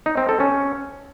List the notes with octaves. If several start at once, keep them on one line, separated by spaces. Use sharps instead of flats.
D#4
C4
A4
C#4